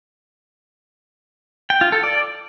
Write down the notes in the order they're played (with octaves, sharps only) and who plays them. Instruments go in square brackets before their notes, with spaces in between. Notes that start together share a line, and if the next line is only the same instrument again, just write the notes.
[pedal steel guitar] G5
F4
A4
D5